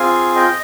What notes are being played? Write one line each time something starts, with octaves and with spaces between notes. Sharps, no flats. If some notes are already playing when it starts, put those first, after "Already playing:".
Already playing: C4 F4 G#4 F5 G#5
D#5 G5